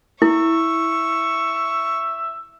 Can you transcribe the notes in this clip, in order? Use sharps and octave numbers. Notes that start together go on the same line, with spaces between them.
E4 E5 C#6